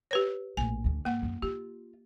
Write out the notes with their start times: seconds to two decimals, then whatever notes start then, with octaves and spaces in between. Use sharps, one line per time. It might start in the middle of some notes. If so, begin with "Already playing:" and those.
0.11 G4 B4 C#5
0.57 A#1 A2 G#5
0.84 D2 D3
1.05 G#2 A#3 F#5
1.22 F#2 D#3
1.42 F4 G4